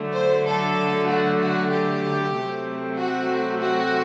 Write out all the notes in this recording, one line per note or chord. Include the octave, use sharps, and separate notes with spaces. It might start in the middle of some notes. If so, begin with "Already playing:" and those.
Already playing: D3 F#3 A3
C5
A4
F#4
F#4
G4
C3 F#3 A3 C4
F#4
F#4